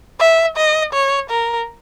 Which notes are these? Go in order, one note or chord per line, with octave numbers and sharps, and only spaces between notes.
E5
D#5
C#5
A#4